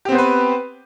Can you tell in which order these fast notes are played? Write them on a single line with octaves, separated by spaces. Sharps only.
G4 C4 B3 C5 B4